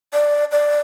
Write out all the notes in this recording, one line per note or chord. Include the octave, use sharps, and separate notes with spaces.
D5
D5